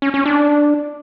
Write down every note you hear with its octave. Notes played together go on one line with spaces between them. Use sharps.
C#4
C#4
D4